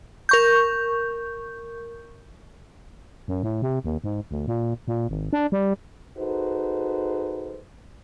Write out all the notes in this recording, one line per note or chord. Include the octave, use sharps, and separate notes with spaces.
A#4 C#6 G6
F#2
A2
C3
D#2
G#2
D2
A#2
A#2
G#1
D4
G3
D#4 F#4 G#4 A4 B4 C5